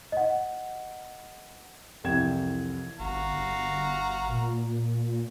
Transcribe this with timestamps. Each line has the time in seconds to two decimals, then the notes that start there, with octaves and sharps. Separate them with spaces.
0.12 D#5 F#5
2.04 C2 F2 E3 G5 G#6 E7
2.99 G1 F#4 F5 A#5
3.33 G1
4.29 A#2